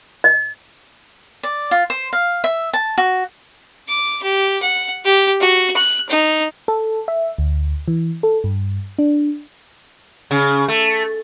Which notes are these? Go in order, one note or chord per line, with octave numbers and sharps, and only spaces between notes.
D#5
D5
F4
C5
F5
E5
A5
F#4
D6
G4
F#5
G4
F#4
F#6
D#4
A4
E5
D2
E3
A4
G2
D4
C#3
A3